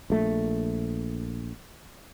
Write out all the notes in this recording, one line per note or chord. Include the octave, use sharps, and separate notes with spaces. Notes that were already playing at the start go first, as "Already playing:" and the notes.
A#1 A3